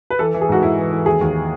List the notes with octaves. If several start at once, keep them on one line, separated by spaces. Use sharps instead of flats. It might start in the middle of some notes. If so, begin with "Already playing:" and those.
B4
E3 A4
E3
G#4
G#2 F#4
G#2 E4
E3
E3
D#2 G#4
D#2